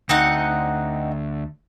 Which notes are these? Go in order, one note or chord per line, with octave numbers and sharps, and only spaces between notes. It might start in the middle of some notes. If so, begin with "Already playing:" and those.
D2 C4 D#4 F#5